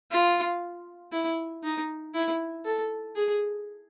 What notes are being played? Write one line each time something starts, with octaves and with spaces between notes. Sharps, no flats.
F4
E4
D#4
E4
A4
G#4